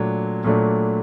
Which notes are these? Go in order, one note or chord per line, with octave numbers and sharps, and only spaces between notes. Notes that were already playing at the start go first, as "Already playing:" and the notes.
Already playing: A#2 F#3 A3 D4
A#2 F#3 A3 D4